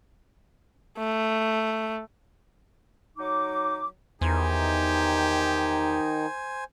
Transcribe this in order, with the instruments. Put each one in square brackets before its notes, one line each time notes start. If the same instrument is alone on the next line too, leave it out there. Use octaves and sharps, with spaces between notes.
[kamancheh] A3
[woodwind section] F#3 D#4 D6
[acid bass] E2 [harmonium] D#3 D#4 [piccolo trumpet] G4 [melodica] C5 G#5